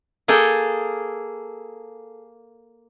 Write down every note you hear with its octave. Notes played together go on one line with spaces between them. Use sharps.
A#3 G#4 A4 G5